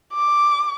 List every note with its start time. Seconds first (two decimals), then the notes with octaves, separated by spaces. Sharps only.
0.13 D6